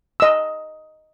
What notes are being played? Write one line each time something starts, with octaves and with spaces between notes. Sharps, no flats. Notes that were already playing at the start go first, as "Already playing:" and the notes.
D#5 E6